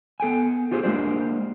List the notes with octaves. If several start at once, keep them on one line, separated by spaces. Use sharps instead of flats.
B3 A4 G5 G#5
F4 G4 G#4 C5
G#3 A#3 D4 G4 C5 D5